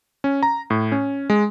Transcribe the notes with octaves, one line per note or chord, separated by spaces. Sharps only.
C#4
A#5
A2
C#4
G#3